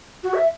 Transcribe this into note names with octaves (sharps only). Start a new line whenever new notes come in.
F#4
E5